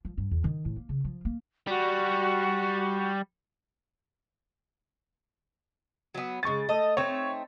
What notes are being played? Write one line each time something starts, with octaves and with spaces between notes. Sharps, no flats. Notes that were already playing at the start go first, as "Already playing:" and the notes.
F3
G2
E2
D#3
A2
A#3
C#3
F3
A#3
G3 F#4
F#3 B3
A#2 C#3 G#3 C#6 A6
A3 D#5 A5
A3 C4 D#4 C#5